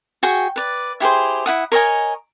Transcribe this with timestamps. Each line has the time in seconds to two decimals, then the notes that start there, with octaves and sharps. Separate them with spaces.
0.23 F#4 G#4 G5 C#6
0.56 B4 D5
1.00 E4 G4 G#4 C5
1.46 E4 F#5 D#6
1.72 A#4 C#5 D#5 G#5